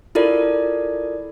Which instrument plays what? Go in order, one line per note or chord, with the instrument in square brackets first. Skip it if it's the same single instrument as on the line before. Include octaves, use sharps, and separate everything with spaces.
[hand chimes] E4 F4 A4 A#4 D5